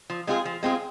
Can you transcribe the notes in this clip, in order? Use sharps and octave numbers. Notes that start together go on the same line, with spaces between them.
F3
G#3 C4 F4 G#4
F3
G#3 C4 F4 G#4